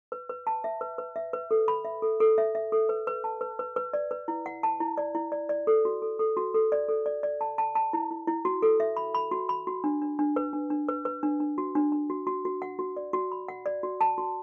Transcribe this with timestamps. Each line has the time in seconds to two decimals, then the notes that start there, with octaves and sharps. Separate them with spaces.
0.12 B4
0.29 B4
0.47 A5
0.64 E5
0.81 B4
0.98 B4
1.16 E5
1.33 B4
1.51 A4
1.68 B5
1.85 E5
2.02 A4
2.20 A4
2.38 E5
2.55 E5
2.72 A4
2.89 B4
3.07 B4
3.24 A5
3.41 B4
3.59 B4
3.76 B4
3.93 D5
4.11 B4
4.28 E4
4.46 F#5
4.63 A5
4.80 E4
4.98 D5
5.15 E4
5.32 D5
5.49 D5
5.67 A4
5.85 F#4
6.02 A4
6.19 A4
6.37 F#4
6.54 A4
6.72 D5
6.88 A4
7.06 D5
7.23 D5
7.41 A5
7.58 A5
7.75 A5
7.93 E4
8.11 E4
8.27 E4
8.45 F#4
8.62 A4
8.80 E5
8.97 B5
9.14 B5
9.31 F#4
9.49 B5
9.67 F#4
9.84 D4
10.02 D4
10.19 D4
10.36 B4
10.53 D4
10.70 D4
10.89 B4
11.05 B4
11.23 D4
11.40 D4
11.58 F#4
11.75 D4
11.92 D4
12.10 F#4
12.27 F#4
12.45 F#4
12.62 F#5
12.79 F#4
12.97 D5
13.13 F#4
13.32 B5
13.48 F#5
13.66 D5
13.83 F#4
14.01 A5
14.18 F#4